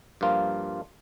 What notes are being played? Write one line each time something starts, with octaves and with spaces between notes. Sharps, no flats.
G2 F3 A#3 F4